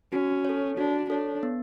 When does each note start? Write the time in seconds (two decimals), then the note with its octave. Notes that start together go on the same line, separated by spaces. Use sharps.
0.12 C#4 F#4
0.45 A4 C#5
0.77 D4 F#4
1.10 D4 A4 C#5
1.43 B3